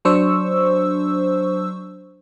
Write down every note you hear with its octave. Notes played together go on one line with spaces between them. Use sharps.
F#3 D4 C5 C#6 E6